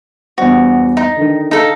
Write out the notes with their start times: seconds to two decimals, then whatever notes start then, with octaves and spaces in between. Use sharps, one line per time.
0.38 E2 G2 F#4 C5
0.97 D#4
1.17 D3 D#3
1.51 D#4 A4 F5